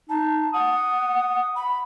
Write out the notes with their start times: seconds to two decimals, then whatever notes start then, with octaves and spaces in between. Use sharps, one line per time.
0.09 D#4 A5
0.54 F#5 D#6
1.55 B5